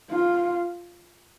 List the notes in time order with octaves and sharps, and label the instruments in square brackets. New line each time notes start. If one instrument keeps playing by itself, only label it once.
[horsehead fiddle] F4